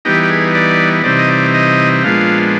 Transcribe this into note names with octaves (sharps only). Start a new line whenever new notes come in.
E3 G3 B3 D#4 G4
G4
G#4
D5
C3 E3 G3 C4 D#4 D5
D#5
D5
D#5
A#2 F3 G#3 B3 D4 F5